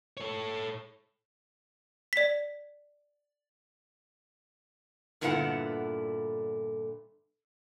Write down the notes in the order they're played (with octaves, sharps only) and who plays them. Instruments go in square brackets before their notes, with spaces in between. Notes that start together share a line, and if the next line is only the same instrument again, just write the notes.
[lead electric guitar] A4 C#5
[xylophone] D5 B6
[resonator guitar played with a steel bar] G2 A#2 D3 B3 E4 F#5